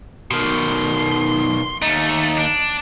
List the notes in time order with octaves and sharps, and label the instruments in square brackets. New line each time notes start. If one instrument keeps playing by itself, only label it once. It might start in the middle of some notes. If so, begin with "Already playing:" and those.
[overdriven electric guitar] B2 D#3 [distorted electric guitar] C6
[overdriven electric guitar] D#2 D#4 [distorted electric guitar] A3
[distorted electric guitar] D4